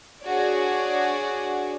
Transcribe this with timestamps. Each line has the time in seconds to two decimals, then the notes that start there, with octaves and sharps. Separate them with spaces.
0.23 D4 F#4 G#4 C#5 D5